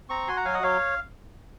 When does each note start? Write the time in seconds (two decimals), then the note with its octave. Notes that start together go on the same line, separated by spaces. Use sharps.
0.09 C4 A#5 C#6
0.28 F#4 G#5 C6
0.36 F#5 A#5
0.45 F#3 F5 G#5
0.54 D#5 F#5
0.62 F#3 C#5 F5